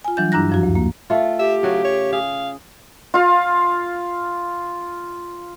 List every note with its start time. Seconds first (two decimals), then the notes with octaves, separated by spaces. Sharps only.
0.04 F4 G#5
0.17 E3 F#3 G3 D4 G6
0.32 G2 D4 E4 A#5 F#6 A#6
0.50 F#2 F3 F#4
0.63 D2
0.75 A#3
1.10 A3 F4
1.39 G4 E5
1.63 C#3 F#3
1.85 C#5
2.12 G#4 F5
3.14 F4 F5